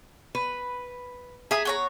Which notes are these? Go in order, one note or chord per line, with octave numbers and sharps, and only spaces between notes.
B4
G#4 E5 A#5 D#6
B3 C#5 A#5